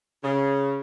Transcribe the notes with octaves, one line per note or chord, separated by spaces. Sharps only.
C#3